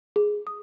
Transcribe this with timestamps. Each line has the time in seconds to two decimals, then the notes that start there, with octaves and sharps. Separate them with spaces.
0.16 G#4
0.47 D#6